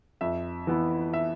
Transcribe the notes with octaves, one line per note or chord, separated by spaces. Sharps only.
F2 E5
E3 B3 E4
E5